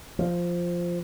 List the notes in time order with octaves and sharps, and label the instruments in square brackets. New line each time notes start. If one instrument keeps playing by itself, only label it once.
[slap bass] F3